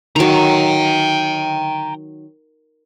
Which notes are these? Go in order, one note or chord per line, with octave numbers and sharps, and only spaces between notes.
D#3 F#3 G5 A#5